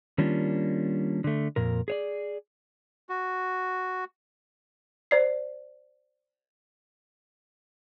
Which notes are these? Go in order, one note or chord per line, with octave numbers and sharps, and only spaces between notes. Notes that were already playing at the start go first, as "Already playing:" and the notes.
D#3 G3 A#3 C#4 D4 F4
D3 A3
F2 A#2 A#4
G#4 C#5 D5
F#4
C5 D5 C7